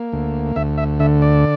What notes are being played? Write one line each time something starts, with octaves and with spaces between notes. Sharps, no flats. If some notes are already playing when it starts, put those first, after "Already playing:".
Already playing: A#3
D2
D2 E5
E5
D3 E5
D5